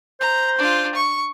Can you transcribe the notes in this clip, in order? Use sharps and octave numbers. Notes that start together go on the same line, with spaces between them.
C5 A#5
D4 F4
C#6